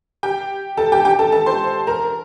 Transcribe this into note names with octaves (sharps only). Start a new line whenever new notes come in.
G4 G5
A4 A5
G4 G5
G4 G5
A4 A5
A4 A5
C5 C6
A#4 A#5